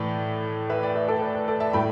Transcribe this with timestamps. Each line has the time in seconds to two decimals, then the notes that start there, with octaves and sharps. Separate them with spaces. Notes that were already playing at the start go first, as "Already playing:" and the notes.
Already playing: A2 E3 D5
0.70 B4 E5
0.83 D5 G5
0.95 B4 E5
1.08 A4 D5
1.22 B4
1.35 B4
1.48 A4 D5
1.60 E5 A5
1.73 A2 G5 B5